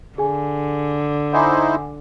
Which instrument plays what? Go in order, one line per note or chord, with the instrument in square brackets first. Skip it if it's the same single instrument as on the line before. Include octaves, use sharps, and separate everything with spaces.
[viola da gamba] D3 [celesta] G#4 G#5
[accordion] D#4 E4 C5 [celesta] F#5 G#5 D6